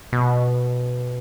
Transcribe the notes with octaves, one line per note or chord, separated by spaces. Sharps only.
B2